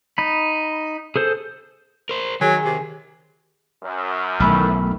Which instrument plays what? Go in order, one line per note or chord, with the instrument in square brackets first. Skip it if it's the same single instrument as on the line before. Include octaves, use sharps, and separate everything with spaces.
[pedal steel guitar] D#4 B5
G#4 A4 C5
[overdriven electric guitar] A#4 C5
[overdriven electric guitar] D#3 [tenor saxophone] F#3 [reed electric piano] G#4 G#5
[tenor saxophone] C3
[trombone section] F#2
[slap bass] B1 [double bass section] D#3 E3 A3 [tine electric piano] B5 E6 F6